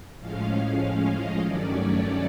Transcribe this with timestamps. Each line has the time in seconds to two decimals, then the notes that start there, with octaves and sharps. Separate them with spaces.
0.19 A2 F3 G#3 C#4 F5
0.81 F5
1.11 D#5
1.41 G2 D#3 F#3 A3 C#4 D5
1.71 C#5